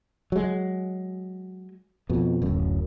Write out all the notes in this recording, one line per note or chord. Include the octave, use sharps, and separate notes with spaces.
F#3 G#3
F2 B2
D1 F#2